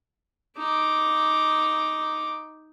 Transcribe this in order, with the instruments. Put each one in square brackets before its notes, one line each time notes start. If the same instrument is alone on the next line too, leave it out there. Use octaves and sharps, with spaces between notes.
[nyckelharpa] D#4 D6